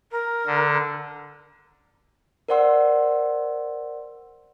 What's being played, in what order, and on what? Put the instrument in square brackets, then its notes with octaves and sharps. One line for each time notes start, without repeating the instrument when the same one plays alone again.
[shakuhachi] A#4
[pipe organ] D3
[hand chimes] A#4 C5 D5 F#5 C6 E6